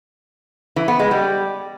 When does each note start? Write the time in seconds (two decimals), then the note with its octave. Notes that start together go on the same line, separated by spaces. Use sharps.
0.76 E3
0.88 B3
1.00 G#3
1.11 G3